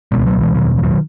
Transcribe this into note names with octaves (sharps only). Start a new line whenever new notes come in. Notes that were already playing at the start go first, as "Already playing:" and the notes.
C#2 B2 G#3 B3
F#3 A3
E3 G#3
E2 B2 D#3 F#3
E3
D#3 F#3